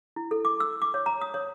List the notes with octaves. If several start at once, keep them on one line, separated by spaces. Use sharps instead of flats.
E4
A4
D6
E6
D6
C#5
A#5
D#6
C#5